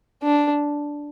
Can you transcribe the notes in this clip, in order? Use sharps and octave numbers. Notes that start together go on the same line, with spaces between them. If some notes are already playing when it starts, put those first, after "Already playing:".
D4